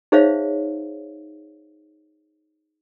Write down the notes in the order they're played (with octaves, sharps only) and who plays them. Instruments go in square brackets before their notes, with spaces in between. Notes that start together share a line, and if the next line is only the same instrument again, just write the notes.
[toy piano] D#4 G#4 C5 C#5 E5 F5